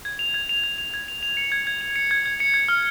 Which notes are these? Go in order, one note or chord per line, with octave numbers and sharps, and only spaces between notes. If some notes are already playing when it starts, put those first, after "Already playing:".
G#6
F7
G#6
F7
G#6
F7
G#6
F7
F7
C#7
G#6
G#6
F7
C#7
G#6
G#6
C#7
G#6
F6